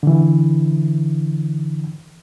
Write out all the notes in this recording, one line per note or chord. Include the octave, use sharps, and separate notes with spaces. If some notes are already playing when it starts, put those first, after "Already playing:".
D3 E3